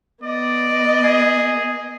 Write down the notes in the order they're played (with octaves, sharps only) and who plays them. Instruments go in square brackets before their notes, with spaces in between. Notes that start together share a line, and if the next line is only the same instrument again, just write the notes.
[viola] B3 D#5 [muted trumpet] D5
[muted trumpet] G#4